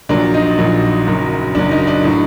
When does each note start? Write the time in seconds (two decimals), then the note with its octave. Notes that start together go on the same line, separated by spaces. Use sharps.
0.09 A#1 A#2 F#3 D4
0.34 D#4
0.58 A#1 A#2 F#3
1.07 F#1 F#2 F#3
1.55 F#1 F#2 F#3 D4
1.71 D#4
1.87 D4
2.04 A2 F#3